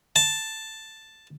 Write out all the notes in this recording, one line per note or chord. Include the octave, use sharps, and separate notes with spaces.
A5